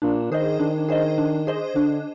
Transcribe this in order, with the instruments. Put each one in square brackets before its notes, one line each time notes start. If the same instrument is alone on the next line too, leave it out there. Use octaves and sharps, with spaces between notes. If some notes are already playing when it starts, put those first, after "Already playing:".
[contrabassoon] A#2 [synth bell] D4
[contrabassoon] D#3 [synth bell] G#4 C5 D#5
[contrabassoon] D#3 [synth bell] D4
[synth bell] G#4 C5 D#5
D4
G#4 C5 D#5
[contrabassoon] D3 [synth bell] D4